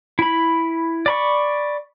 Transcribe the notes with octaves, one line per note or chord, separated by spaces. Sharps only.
E4 B5
D5 B5 C#6